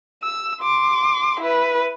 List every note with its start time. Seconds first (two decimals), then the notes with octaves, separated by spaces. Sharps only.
0.23 E6
0.61 C6 D6
1.40 E4 B4